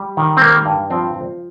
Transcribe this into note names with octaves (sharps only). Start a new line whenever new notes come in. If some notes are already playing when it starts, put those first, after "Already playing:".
Already playing: G3
D#3
C4
G3 A#3
G2
F3 C4
F3